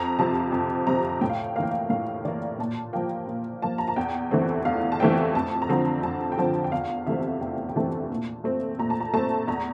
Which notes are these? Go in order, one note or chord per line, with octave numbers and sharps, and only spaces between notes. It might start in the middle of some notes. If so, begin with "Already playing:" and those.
Already playing: F2 A#5
C3 F3 C4 A5
F2
C3 F3 C4 A#5
A2 G5
F5
G5
E3 A#3 F5 G5
F5
A2 F5
E3 A#3 D5
A#2 A5
F3 A#3 G5
A#2
F3 A#3 A5
A#5
A5
E2 G5
E3 A3 C4
E2 F5
A5
E3 A3 C4 G5
F2 A5
A#5
D3 F3 C4 A5
F2 A5
G5
D3 F3 C4 A5
G5
E2 F5
C3 E3 A3 C4 E5
E2 G5
G5
C3 E3 A3 C4 A5
A#2
A3 C4
A#2 A#5
A5
A#5
A3 C4 A5
E2 A#5